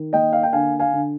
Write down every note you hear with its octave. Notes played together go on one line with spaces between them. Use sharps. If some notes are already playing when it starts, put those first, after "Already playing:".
Already playing: D#3
A#3 D#5 G5
F5
G5
D3 F5 G#5
F5 G#5
D3